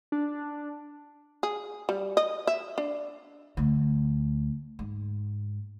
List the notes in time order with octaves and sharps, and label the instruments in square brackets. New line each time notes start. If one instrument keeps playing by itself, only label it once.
[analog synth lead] D4
[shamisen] G#4
G3
D#5
E5
D4
[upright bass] D2
G#2